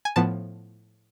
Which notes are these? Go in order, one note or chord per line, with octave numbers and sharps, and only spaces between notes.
G#5
A2 F3 B3 A5